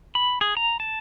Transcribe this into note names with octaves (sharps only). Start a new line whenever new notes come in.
B5
G#4
A#5
A5